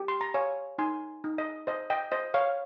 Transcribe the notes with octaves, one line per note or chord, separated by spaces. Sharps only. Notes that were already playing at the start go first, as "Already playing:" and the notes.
Already playing: G4
C6
A#5
C#5 F5 G#5
D#4 G#5 C6
D#4
D#5
C5 D#5
D#5 G5
C5 D#5
C#5 F5